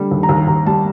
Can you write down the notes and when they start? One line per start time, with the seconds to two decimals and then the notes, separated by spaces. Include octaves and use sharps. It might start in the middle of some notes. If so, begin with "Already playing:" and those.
Already playing: D3 G3
0.11 D#2
0.23 A#5
0.29 D#2
0.47 D#2 A#5
0.66 G3 A5